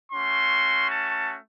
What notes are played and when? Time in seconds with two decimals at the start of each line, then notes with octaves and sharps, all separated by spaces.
0.12 A3 C#4 F#4 C6
0.90 A5